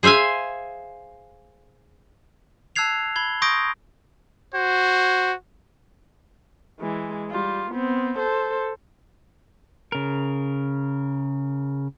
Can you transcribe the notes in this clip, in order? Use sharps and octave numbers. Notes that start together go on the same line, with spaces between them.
G#4 C5 E5 F5 G#5
A5 E6 F#6 G#6 C7 F7
B5 G#6 G7
C6 C#6 D#6 G6 A#6 D7
F#4 C5
E3 G#3
G3 F4
B3 C4
A4 C5
C#3 A#4